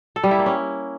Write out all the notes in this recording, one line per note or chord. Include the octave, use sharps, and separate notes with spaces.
A4
G3
E4
A#3
C#4